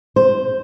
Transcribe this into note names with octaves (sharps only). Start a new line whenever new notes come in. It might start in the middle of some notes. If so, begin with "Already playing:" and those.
C5